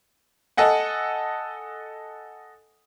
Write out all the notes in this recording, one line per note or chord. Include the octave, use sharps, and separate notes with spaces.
A4 D#5 F#5 G#5